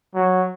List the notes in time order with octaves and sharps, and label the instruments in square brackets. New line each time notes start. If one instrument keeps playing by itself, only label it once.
[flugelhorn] F#3